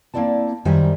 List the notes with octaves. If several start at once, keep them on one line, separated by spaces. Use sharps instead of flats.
A#3 C4 E4 D5 A5
F#2 D#3 G3 C5 E5 G#5